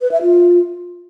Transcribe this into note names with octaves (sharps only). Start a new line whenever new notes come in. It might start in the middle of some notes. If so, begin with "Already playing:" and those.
B4
E5
F4